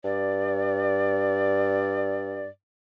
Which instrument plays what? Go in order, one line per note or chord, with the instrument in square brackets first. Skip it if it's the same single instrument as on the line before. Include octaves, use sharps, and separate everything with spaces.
[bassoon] G2 [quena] D5